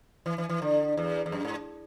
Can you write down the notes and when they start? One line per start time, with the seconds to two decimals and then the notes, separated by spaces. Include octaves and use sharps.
0.26 E3
0.38 E3
0.49 E3
0.62 D3
0.97 E2
1.26 E2
1.32 F#2
1.45 G#2